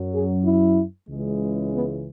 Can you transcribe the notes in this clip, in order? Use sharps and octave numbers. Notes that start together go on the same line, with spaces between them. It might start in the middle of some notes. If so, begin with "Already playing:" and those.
Already playing: F#2 F#3
G#4
E4
C#2 C#3 E3 G#3
B3